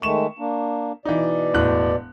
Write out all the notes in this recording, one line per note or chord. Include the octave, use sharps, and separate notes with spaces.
D#3 G#3 A3 C#6 E7
A#3 D4
B2 E3 D#4 D5
E1 A2 F#6